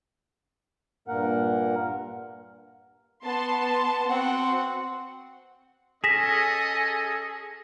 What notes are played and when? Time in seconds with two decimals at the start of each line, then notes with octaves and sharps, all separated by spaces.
1.08 G2 A#2 A#3 A#4 F#5
3.24 B3 A5 C6
4.10 C4 F#4 F#5
6.04 C#4 G#4 A4 D#5 A#6 B6 E7